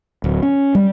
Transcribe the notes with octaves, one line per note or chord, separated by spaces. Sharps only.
D1
C#4
G3